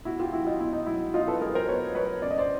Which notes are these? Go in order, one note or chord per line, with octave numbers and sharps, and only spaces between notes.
B2 E4 F#4
F4 G4
F#3 E4 F#4
D#4 F4
B2 E4
D#4
F#3 E4
B2 D#4 F4
A4 B4
F#3 G#4 A#4
A#4 C5
B2 B4 C#5
F#3 B4 C#5
C#3 D5
D#5
C5 D5